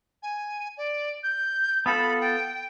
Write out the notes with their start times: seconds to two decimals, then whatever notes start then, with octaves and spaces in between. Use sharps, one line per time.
0.23 G#5
0.77 D5
1.23 G6
1.86 B3 F4 A4 B5
2.21 G5